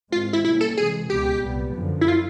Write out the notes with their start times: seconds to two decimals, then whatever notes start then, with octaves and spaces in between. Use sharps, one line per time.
0.12 G#2 D#3 G#3 C4 F4
0.33 E4
0.45 B2 G3 A#3 C#4 E4
0.61 A4
0.77 C3 E3 G#3 G#4
1.10 C#2 B2 G#3 B3 G4
1.42 C2 A#2 G3 B3
1.74 F#2 D3 F3
2.01 E4
2.08 F4